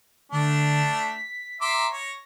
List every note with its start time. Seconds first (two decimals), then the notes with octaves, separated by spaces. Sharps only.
0.32 D3 A3 D4
0.94 B6
1.61 E5 A#5 C6 D6
1.92 C#5 A#6